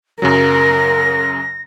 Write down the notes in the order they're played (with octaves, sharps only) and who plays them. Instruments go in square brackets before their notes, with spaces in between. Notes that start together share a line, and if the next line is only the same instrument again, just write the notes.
[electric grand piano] F#2 C#3 F#3 [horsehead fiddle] A#4 [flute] A#6